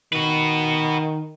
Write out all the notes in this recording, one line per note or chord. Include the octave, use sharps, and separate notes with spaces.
D#3 F#4 B4